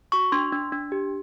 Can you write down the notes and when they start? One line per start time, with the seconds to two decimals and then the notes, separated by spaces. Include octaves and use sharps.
0.12 F#4 C#6
0.32 D4 C6
0.52 D4
0.72 D4
0.92 G4